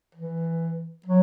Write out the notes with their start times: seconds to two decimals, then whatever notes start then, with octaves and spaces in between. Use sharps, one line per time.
0.15 E3
1.06 F#3